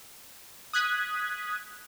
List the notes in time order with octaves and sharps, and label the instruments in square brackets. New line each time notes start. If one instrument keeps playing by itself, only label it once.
[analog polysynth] D#6 F#6 G#6 B6